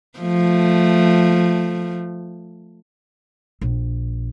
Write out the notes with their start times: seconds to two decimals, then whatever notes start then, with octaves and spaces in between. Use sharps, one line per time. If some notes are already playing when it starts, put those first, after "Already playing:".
0.19 F3 A3
3.61 A#1